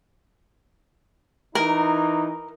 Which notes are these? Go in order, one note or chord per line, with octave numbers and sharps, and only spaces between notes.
E3 D#4 A#4